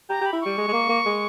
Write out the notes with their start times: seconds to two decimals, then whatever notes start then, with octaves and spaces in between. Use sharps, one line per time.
0.09 G4 A#5
0.21 G4
0.26 B5
0.33 E4
0.41 G3 C#6
0.57 G#3
0.68 G#3
0.73 A#3
0.89 A#3
1.05 G#3